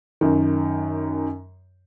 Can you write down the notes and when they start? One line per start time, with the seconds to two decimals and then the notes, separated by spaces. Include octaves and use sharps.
0.21 F#2 D#3